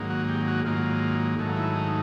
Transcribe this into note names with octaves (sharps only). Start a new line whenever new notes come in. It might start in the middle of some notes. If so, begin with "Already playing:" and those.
Already playing: G#2 D#3 F#3 A#3
F#4
G4
F#4
G#2 D#3 F#3 A#3 F4
G#2 D#3 F#3 A3
E4
D#4